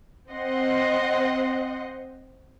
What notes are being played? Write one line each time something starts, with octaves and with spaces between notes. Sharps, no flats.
C4 D#5 F#5 C6